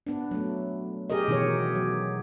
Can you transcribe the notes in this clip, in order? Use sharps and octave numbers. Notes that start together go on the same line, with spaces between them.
B3 D4
F#3 A3
G4 G#4 A#4 D#5
B2 D#3 E3 D#4 G4 C#5
F#3